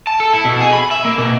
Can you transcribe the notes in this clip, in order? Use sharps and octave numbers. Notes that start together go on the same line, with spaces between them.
A5
A4
E4
B2
G#4
B5
E5
A#3
B2